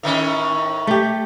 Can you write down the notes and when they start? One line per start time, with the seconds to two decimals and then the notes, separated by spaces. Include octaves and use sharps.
0.03 A2 D#3 C#4
0.87 A3 G4